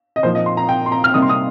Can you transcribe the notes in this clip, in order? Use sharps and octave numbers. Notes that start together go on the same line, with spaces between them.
D#5
A#2 F3 D#4 C5
D#5
C6
A#5
G5
C6
A#5
F6
C3 G3 A#3 D#4 D#6
C6
D#6